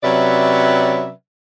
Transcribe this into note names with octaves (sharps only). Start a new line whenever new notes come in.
C3 F#3 C#4 B4 D5 E5